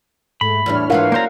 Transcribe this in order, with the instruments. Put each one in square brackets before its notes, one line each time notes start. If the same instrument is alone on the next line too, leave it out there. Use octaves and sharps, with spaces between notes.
[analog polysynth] G#2 A3 [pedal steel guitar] B5
[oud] E2 A2 G3 [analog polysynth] D4 C#5 F6
[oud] G#2 E3 F4 [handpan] A#4 F5 F#5
[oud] F#3 C#4 [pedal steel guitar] A#3 C5 A#5